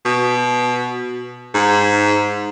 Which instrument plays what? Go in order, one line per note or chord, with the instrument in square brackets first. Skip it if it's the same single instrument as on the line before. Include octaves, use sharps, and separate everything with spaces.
[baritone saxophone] B2
G#2